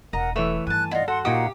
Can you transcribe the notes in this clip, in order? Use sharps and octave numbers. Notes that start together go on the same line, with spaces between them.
E1 A#4 D#5 F#5 A#5
E3 A3 A4 B4 C#5 E5
G2 D#3 G#5 A5 F#6
E4 F4 D5 D#5 F#5
F#4 A4 F#5 C6
A#2 D#4 F#4 G4 F5 F#5 D#6